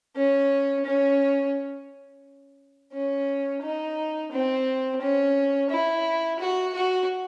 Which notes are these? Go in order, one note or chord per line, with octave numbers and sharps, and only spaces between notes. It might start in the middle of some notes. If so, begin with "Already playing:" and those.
C#4
C#4
C#4
D#4
C4
C#4
E4
F#4
F#4